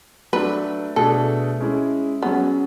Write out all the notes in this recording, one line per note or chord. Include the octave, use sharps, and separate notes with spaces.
F#3 A3 D4 B4
B2 A3 D4 G#4 A4
G#3 C#4 E4 G#4
F#3 B3 C#4 G#4